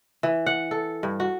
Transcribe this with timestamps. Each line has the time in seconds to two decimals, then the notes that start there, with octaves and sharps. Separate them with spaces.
0.23 E3
0.46 F#5
0.71 A4
1.03 G2
1.20 F#4